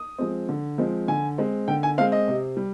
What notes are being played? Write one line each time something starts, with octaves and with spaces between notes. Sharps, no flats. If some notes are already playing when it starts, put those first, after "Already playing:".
Already playing: D#6
F3 G#3 C4
D3
F3 G#3 C4
D3 G#5
G#3 C4
D3 G5
G#5
G#3 C4 F5
D#5
C3
G3